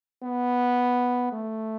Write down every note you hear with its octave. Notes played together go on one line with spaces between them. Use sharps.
B3
A3